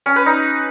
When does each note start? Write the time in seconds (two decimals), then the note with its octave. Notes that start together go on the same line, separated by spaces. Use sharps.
0.06 C#4
0.16 B4
0.26 D#4